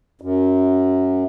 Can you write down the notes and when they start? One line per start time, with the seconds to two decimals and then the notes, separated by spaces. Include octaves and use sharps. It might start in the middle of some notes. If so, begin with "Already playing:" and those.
0.21 F#2